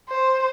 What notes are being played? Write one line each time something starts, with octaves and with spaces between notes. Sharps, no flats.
C5